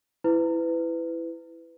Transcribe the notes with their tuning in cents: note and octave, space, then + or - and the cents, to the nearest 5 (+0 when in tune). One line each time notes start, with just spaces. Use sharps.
E4 +5 B4 +25